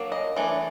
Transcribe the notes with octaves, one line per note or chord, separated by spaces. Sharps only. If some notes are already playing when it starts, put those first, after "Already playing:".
Already playing: F#3 A#3 D4
D#5
E3 A3 D4